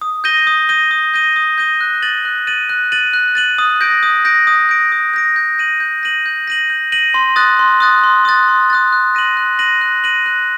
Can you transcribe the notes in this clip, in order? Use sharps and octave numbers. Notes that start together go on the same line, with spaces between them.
D#6
G6 A#6 D#7 G7
D#6
G6 A#6 D#7 G7
D#6
G6 A#6 D#7 G7
D#6
G6 A#6 D#7 G7
F#6
A6 D#7 F#7
F#6
A6 D#7 F#7
F#6
A6 D#7 F#7
F#6
A6 D#7 F#7
D#6
G6 A#6 D7
D#6
G6 A#6 D7
D#6
G6 A#6 D7
D#6
G6 A#6 D7
G6
A#6 D#7 F#7
G6
A#6 D#7 F#7
G6
A#6 D#7 F#7
G6
A#6 D#7 F#7
C6
D#6 F#6 A6
C6
D#6 F#6 A6
C6
D#6 F#6 A6
C6
D#6 F#6 A6
F#6
A#6 D#7 F#7
F#6
A#6 D#7 F#7
F#6
A#6 D#7 F#7
F#6